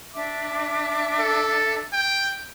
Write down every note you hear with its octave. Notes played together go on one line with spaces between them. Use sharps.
D4 E5 D6
A4
G5